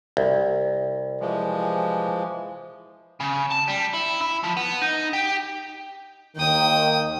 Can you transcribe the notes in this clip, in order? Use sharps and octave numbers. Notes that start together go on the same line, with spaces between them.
C2
E3 F3 G#3
C#3
A5
G3
E4
E4
F3
B3
D#4
G4
D#2 D#3 G5 D#6